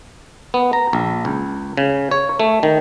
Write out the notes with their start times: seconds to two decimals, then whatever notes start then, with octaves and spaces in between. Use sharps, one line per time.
0.54 B3
0.73 A#5
0.93 A#1
1.25 C#2
1.77 C#3
2.11 C#5
2.40 A3
2.63 D#3